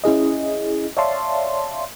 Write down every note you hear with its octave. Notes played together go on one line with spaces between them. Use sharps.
C#4 E4 G#4 D#5
C#5 D5 E5 F5 A5 C6